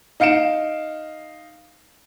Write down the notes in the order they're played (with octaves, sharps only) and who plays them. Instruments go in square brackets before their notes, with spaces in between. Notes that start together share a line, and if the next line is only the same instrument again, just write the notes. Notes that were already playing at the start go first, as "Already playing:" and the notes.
[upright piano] D#4 F5 C#7 D7 E7